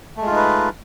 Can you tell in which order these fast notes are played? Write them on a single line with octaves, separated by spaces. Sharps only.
A3 G#3 F4 D#4 B4